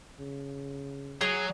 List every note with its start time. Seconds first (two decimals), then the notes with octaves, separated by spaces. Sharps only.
0.19 C#3
1.21 F#3 G#4